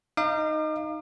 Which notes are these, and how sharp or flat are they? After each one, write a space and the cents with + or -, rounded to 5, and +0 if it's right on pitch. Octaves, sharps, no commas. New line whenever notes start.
D#4 -5 F5 -25 D6 +40